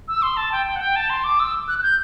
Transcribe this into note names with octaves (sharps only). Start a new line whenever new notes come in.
E6
C6
A5
G5
G5
F#5
G5
A5
C6
D6
E6
F#6
F#6
G6